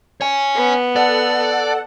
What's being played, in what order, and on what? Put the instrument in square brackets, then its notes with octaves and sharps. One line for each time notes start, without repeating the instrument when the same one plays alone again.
[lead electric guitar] C#5 G#5
[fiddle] B3
[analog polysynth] A4 F#5 [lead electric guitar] D5